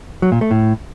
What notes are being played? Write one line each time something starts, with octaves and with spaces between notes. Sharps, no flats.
F#3
A#2
A3
A2